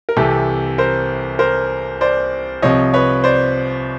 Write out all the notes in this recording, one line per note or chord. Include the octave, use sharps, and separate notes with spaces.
A#4
C2 C3 E3 G4 A4
A#4 C5
A#4 C5
C5 D5
C2 C3 F3 C#5 D#5
B4 C#5
C5 D5